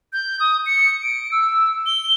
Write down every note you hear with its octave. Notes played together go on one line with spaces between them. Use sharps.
G6
D#6
C#7
D7
E6
G7